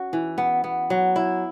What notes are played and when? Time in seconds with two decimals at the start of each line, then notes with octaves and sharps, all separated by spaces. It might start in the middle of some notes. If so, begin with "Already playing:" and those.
Already playing: C#4 F#4
0.13 E3
0.38 B3
0.64 B3
0.90 F#3
1.16 E4